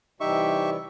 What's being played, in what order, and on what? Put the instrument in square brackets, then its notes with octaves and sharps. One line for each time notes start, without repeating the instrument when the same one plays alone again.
[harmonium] C3 E3 G3 [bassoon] D#4 [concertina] G4 E5 C#6